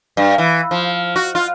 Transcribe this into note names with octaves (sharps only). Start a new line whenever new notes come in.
G2
E3
F3
F#4
F4